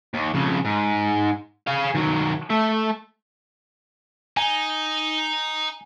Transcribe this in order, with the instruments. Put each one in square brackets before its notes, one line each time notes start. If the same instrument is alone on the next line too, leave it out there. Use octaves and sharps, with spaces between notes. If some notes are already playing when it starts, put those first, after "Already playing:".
[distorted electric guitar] D#2
F2 C#3
G#2
G#4 F5
D#3 F#3
A3 E5
[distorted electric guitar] D#4 [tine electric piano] G#5